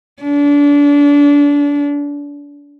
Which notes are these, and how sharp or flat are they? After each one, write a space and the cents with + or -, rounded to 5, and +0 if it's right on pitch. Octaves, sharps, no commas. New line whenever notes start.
D4 -30